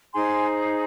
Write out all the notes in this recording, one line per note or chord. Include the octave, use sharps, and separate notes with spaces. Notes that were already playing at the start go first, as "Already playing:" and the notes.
D#4 G#4 C5 G#5 C6